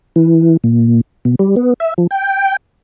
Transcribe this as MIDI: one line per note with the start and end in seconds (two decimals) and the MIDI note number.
0.16 0.57 52
0.64 1.01 46
1.25 1.35 47
1.39 1.55 55
1.56 1.74 59
1.80 1.94 76
1.98 2.07 53
2.11 2.56 79